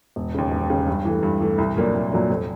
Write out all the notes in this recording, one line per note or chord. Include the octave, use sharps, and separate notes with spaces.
E1
D#2 C#3
E1
D#2 C#3
G2
E3 A3
G2
E3 A3
C2
A#2 F#3 A#3 D4
C2
A#2 F#3 A#3 D4
F1